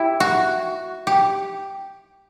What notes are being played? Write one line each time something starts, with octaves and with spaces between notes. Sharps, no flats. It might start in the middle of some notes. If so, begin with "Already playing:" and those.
Already playing: E4 G4
F#4
G4